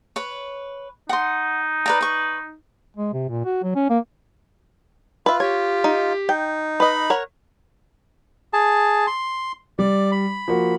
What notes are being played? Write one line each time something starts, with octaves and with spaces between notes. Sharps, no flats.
B4 C#5
D#4 F#5 C6
B4 D5 A#5
B4 C#6
G#3
C3
A#2
F#4
F#3
C#4
A#3
F4 B4 E5
G4 C#5
D#4
D#4 G5
B4 D#5 B5
A#4 C#5 F#5
G#4 A5
C6
G3 D5
B5
F3 A#3 F#4